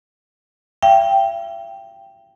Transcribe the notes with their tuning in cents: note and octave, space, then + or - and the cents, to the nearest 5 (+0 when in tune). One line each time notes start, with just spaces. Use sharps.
E5 +45 G5 +0